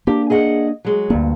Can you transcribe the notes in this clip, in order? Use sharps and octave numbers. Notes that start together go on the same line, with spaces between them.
A#3 D4 G4
G#4 D#5 F#5
F#3 G#3
D2 G2 A3 A#3